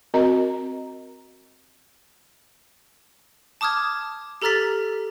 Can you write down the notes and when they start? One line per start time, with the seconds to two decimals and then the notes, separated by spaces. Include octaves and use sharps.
0.14 C4 F#4 A#4 D#5 A#5
3.61 A5 D6 D#6 F6 G#6
4.42 G4 A4 A#5 F6 A6 B6